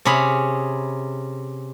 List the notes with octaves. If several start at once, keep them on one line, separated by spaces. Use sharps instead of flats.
C3 C#4 G#4 B5